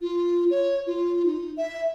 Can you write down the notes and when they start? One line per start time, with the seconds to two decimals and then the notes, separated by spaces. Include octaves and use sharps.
0.01 F4
0.51 C#5
0.87 F4
1.26 D#4
1.57 E5